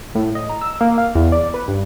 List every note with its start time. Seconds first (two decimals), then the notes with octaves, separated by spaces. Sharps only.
0.15 A2
0.35 D#5
0.49 A#5
0.61 E6
0.81 A#3
0.98 F5
1.15 E2
1.32 D5
1.54 B4
1.68 G2